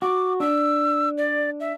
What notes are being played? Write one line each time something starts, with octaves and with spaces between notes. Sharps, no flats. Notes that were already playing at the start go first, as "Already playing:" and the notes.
F#4 D6
D4 E6
D5
E5